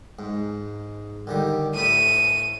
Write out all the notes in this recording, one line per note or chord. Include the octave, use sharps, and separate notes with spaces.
G#2
D3 D#3 G3
A2 B5 D#7